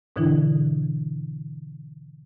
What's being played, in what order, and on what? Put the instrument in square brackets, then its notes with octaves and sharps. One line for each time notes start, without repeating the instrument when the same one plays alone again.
[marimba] G#2 B2 D3 E3 D4 E4